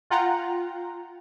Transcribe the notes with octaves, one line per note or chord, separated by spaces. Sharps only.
F4 F#5 G5 A#5